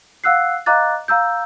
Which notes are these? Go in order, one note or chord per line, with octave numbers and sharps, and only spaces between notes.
F5 F#5 E6 F#6 C7
D#5 F5 A#5 D6 F#6 A6
F5 A#5 E6 G6